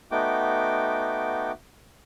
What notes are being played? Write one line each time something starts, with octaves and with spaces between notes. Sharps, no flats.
A3 B3 D#4 F#4 G5 D6